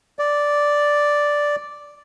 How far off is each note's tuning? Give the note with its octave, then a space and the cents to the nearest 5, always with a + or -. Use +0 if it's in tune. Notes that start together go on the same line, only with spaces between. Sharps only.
D5 -5